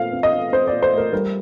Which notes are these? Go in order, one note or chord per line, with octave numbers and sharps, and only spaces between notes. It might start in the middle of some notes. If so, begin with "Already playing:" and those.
Already playing: A#2 A3 C4 F5
C4
D#5
C4
C4 C5
A#2 D5
C5
A3 A#4
G3 A#4